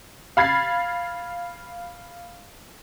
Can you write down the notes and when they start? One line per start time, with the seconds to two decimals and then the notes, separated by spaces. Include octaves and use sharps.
0.37 F5 B5 G#6 A6 C7